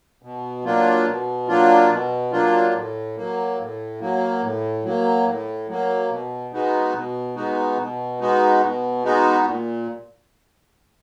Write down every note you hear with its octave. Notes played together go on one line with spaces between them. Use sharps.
B2
F#3 A#3 D4 F4
B2
F#3 A#3 D4 F4
B2
F#3 A#3 D4 F4
A2
F#3 A#3
A2
F#3 A#3
A2
F#3 A#3
A2
F#3 A#3
B2
G#3 B3 D#4 F#4
B2
G#3 B3 D#4 F#4
B2
G#3 B3 D#4 F#4
B2
G#3 B3 D#4 F#4
A#2